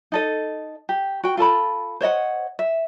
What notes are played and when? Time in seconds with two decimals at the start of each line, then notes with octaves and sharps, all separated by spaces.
0.12 D#4 A4 D#5
0.89 G4
1.24 F#4 G5
1.37 F4 A4 A5 B5
2.01 C5 C#5 D#5 F#5
2.59 E5